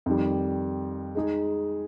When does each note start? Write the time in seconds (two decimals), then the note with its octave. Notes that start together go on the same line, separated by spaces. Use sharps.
0.06 F2 D#3 G3
1.15 G#3 D#4 G#4